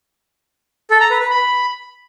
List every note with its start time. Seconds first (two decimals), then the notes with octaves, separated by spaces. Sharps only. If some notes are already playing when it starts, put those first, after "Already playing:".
0.90 A4
1.00 A#5
1.11 B4
1.21 B4
1.31 B5